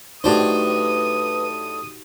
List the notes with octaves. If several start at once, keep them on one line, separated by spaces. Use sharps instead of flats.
A2 D4 D#4 F#4 G4 B4 C5 D#6